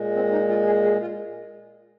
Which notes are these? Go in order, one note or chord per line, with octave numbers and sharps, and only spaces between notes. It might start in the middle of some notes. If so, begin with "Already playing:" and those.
Already playing: A#2 G#3
C4
D#4
F4
G#4
G#4
F4